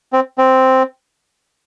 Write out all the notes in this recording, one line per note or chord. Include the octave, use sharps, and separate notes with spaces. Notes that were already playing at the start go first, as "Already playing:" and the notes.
C4
C4